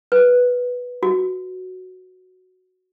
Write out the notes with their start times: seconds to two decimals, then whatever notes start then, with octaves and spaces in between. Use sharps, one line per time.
0.12 B4
1.03 F#4